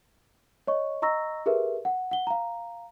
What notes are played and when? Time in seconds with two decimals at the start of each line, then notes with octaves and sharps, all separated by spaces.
0.67 C#5 D#5 C#6
1.02 D#5 A#5 C#6 E6 A#6
1.46 G4 G#4 A#4 B4 E5
1.85 F#5
2.11 F#5 G7
2.27 F5 A#5